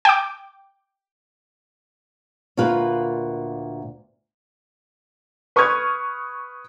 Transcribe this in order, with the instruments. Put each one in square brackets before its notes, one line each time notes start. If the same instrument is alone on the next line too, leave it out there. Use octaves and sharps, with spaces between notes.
[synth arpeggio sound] G5 D6
[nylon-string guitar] D2 A#2 A#3 F4 B4
[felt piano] B4 C#6 D#6 F6 G#6